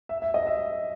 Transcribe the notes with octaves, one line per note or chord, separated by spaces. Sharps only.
E5
E5
D#5
E5